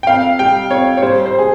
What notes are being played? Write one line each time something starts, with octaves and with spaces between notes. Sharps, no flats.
G5
F2 F5
G3 G5
F2 C#5
C#5
G3 C5
C5
G#4